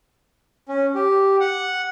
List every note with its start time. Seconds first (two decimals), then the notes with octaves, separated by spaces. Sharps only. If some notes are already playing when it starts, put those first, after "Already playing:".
0.69 C#4
0.95 G4
1.40 F#5